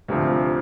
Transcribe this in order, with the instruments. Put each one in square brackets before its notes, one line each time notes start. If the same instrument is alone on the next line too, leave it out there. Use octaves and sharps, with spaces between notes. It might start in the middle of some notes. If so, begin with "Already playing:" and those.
[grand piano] D2 C3 F3